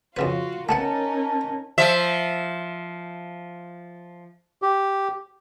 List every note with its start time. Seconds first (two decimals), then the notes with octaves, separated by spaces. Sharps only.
0.17 F2 C#3 F4 F#4 B4
0.69 A3 B3 C#4 D#4 A#4 F#5 A5
1.78 F3 E5
4.62 G4